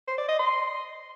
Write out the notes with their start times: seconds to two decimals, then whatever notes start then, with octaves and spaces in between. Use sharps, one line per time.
0.08 C5
0.18 D5
0.29 D#5
0.39 C6